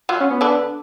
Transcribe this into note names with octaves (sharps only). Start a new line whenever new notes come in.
F#3 F4 F#4
C#4
B3
D3 D4